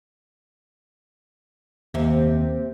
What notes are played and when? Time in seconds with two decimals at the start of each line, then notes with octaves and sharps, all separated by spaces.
1.94 D#2 C3 A#3